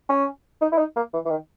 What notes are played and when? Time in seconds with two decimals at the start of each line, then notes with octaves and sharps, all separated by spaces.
0.09 C#4
0.61 D#4
0.72 E4
0.78 D#4
0.96 A#3
1.14 E3
1.25 E3
1.30 D#3